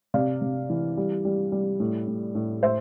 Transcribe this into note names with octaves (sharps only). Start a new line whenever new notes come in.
C3 D5 F5
C3
E3
G3
G3
G3
A2
A2
A2
A2 C5 E5